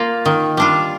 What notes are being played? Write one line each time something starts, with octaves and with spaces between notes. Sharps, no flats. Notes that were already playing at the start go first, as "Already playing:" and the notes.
Already playing: A#3 F4
D#3
G3 D4 F4